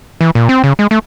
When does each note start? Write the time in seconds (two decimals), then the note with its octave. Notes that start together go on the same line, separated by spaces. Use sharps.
0.21 E3
0.35 A#2
0.49 C4
0.64 C#3
0.79 G#3
0.91 A3